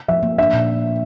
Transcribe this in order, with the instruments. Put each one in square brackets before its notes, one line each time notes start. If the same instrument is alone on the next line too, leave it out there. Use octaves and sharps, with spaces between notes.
[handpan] F3 [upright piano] E5
[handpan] A#3
[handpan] D4 [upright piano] E5
[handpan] A#2